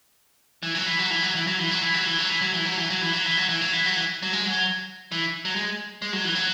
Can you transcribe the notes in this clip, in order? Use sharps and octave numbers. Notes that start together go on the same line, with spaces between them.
E3
F#3
E3
F#3
E3
F#3
E3
F#3
E3
F#3
E3
F#3
E3
F#3
E3
F#3
E3
F#3
E3
F#3
E3
F#3
E3
F#3
E3
F#3
E3
F#3
E3
F#3
G#3
F#3
E3
F#3
G#3
G#3
F#3
E3
F#3